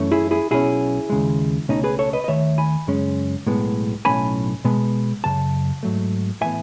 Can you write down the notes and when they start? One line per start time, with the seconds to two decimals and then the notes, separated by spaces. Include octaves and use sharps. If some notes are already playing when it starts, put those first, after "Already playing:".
Already playing: F#2 E3 A3 C#4
0.12 E4 G#4
0.31 E4 G#4
0.51 B1 B2 A3 C#4 E4 G#4
1.10 D#2 C#3 G#3
1.68 C#2 B2 A3 C#4 D#4
1.84 G#4 B4
1.99 A4 C#5
2.13 B4 D#5
2.24 D#5
2.28 D#2 D#3 A3 C#5 E5
2.58 G#5 B5
2.87 F#2 C#3 G#3 C#4
3.46 B1 A2 G#3 B3
4.05 B1 A2 F#3 A3 C#4 G#5 B5
4.65 B2 G#3 B3
5.24 F#2 C#3 A5
5.83 G#2 F#3 A3
6.41 A2 E3 B3 E5 G#5